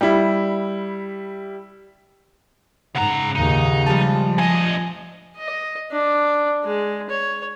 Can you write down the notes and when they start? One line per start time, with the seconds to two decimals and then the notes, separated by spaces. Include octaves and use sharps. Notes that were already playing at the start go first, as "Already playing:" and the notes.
0.01 G3 E4
2.96 G#2 C#3 F#5 A#5
3.36 D#2 A#2 C#3 D#4
3.87 F3 G3 G#3 A5
4.38 D2 D#5 G#5
5.37 D#5
5.91 D4
6.63 G#3
7.09 C#5